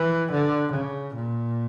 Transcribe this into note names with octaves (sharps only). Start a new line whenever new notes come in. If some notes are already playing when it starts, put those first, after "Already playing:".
Already playing: E3
D3
C#3
A#2